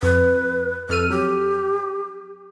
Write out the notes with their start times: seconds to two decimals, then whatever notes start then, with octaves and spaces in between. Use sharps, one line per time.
0.03 F2 B4
0.89 F2 A4 F6 D#7
1.10 F#3 G4